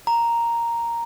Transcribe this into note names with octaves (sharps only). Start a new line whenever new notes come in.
A#5